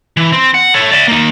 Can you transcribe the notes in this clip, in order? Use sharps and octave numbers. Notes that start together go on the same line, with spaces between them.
E3
C4
F#5
A4 C#5
D5 E5
A#3 D#4